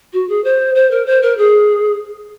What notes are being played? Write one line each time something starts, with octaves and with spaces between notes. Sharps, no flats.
F#4
G#4
C5
C5
A#4
C5
A#4
G#4